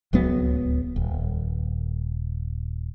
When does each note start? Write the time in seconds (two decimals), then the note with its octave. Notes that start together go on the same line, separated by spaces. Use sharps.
0.13 D1 C#2 F#3 B3
0.96 D#1